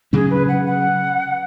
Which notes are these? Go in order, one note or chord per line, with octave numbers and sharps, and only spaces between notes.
C#3 F#3 C#4 G#4
B4
F#5
F#5